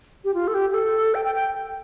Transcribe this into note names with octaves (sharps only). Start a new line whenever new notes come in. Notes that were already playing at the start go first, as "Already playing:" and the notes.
G4
F4
A4
G4
G4
A4
G5
G5
G5